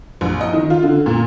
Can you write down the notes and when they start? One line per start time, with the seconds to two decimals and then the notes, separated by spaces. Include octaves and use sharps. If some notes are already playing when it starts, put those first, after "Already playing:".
0.21 A#1
0.41 D#5
0.53 D#3
0.70 F4
0.83 D3
1.06 A#2